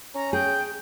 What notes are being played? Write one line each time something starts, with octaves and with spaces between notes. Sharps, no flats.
C#4 A#5
G#4 G5